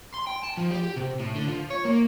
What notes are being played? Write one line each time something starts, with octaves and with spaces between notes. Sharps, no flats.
C6
G5
A5
F3
G4
G4
C3
A2
D3
F3
C#5
A#3